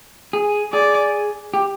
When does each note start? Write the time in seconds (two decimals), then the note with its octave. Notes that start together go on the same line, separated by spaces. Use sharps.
0.33 G#4
0.73 G#4 D5
1.54 G4